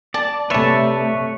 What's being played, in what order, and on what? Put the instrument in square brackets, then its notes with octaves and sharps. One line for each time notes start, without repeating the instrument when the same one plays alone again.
[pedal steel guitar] D5 [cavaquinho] A5
[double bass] C3 A3 [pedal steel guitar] B4 C#5 E5 [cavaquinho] D5 A5